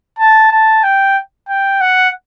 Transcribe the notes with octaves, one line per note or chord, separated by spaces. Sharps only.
A5
A5
G5
G5
F#5